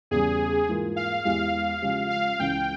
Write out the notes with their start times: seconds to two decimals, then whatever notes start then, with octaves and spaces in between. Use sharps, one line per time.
0.11 E2 C#3 G3 G#4
0.69 G#2 E3 A#3 F4
0.96 F5
1.25 E2 E3 G#3 E4 G4 F5
1.82 C#3 F3 G#3 C#4 G4
2.10 F5
2.39 C#2 C#3 E3 G#3 G5